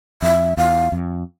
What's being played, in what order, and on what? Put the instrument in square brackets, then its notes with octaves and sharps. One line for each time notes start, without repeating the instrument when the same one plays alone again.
[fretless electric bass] F2 [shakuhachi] E5
[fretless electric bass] E2 [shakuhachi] F5
[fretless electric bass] F2